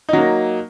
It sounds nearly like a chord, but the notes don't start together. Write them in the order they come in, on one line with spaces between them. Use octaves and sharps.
D#4 F#3 A#3